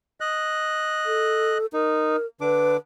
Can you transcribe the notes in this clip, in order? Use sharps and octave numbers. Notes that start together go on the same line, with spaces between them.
D#5 F#6
A4
D#4 A#4
D3 D4 B4 D6